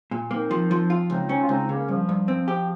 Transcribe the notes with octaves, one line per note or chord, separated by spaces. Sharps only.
A#2
A#3 C4 D#4
F3
F3
F4
C#2 C4 D#4
C4 C#4 D#4
F4
C#2 C4 D#4
C#3 A#3 C#4
G2 F3
G2
C4
G4